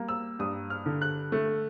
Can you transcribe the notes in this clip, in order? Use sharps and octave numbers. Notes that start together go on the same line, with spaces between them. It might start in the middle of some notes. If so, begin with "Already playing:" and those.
Already playing: G3 A#3
E6
G2 D#6
F6
D3
F#6
A3